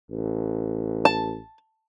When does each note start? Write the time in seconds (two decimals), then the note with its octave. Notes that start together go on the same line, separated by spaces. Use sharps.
0.10 A1
1.05 A5